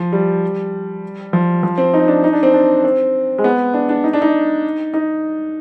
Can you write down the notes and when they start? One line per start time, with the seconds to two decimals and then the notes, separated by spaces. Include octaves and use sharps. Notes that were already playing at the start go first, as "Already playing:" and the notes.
Already playing: F3
0.12 G3
1.33 F3
1.63 F3
1.78 C4
1.94 D#4
2.08 D4
2.24 D#4
2.33 D4
2.43 C4
2.54 D4
2.84 C4
3.38 G#3
3.44 B3
3.74 D4
3.89 D4
4.04 D#4
4.13 D4
4.22 D#4
4.94 D#4